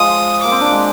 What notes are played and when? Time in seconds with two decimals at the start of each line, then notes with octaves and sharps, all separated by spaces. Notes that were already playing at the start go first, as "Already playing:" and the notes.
Already playing: F3 G#3 D#6
0.41 A#3 D6
0.52 C4
0.61 D4
0.71 G#3